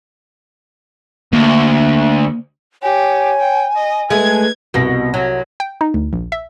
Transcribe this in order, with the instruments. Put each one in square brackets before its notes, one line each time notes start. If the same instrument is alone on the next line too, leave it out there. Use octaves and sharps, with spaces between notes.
[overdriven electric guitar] D2 [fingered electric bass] A#3
[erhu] G4 [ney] C#5 [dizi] G#5
[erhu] G5
D#5
[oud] G#3 A3 [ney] B4 [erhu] G#6
[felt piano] C2 A#6 [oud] B2
[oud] F#3
[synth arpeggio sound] G5
D#4
D2
A#1
E5